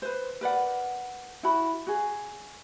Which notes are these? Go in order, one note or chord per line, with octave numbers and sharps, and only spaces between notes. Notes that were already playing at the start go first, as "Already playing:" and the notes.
B4 C5
A#4 B4 D5 F#5
E4 F#4 B5
F#4 G#4